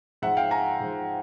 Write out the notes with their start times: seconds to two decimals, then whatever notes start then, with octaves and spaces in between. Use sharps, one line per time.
0.22 G#2 F3 E5 F#5
0.37 F5 G5
0.51 G#5 A#5
0.80 G#2 F3